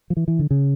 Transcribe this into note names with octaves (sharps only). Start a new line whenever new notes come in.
F3
E3
E3
D3
C#3